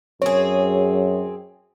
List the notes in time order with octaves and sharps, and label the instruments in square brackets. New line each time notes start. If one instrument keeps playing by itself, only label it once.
[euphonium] F#2 [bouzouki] C4 G#4 [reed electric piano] C#5